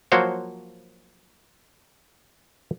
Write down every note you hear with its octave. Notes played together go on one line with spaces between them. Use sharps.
F3 F#3 A#3 F#4 C5 C#5